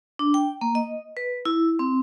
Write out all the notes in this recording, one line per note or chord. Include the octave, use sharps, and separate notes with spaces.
D4
G5
A#3
D#5
B4
E4
C4